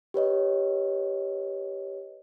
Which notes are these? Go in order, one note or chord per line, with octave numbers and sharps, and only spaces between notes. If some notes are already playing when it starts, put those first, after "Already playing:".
G4 B4 C#5 D#5